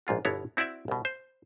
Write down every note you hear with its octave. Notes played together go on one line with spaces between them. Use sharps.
A#1 G#2 F4 F#4
G1 B2 B3 E4 C#5 A#5
C4 E4 F#4 D5 E5
C2 B2
C5